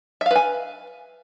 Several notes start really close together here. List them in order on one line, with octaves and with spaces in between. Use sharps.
E5 F5 B4 G#5